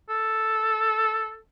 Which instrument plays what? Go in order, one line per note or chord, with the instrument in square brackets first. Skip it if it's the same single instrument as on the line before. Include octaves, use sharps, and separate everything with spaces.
[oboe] A4